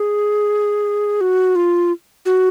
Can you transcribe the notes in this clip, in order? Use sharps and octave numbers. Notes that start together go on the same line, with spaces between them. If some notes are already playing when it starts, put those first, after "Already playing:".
Already playing: G#4
F#4
F4
F#4